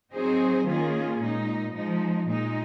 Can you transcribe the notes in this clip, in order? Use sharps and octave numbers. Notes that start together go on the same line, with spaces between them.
F#3 C4 D#4 G#4 C5
D#3 A#3 C#4 F4 G#4
A#2 G#3 D#4
F3 G#3 D#4
A#2 G#3 D#4